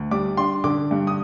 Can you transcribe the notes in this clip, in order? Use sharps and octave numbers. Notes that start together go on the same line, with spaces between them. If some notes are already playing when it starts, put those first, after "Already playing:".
Already playing: D2
G3 D6
D4 C6
D3 D6
G2
D#6